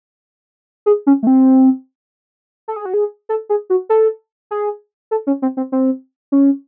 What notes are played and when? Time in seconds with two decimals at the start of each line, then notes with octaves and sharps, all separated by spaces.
0.86 G#4
1.07 C#4
1.23 A3
1.27 C4
2.68 A4
2.76 G#4
2.85 F#4
2.94 G#4
3.29 A4
3.49 G#4
3.70 F#4
3.89 A4
4.51 G#4
5.11 A4
5.27 C#4
5.42 C4
5.57 C4
5.72 C4
6.32 C#4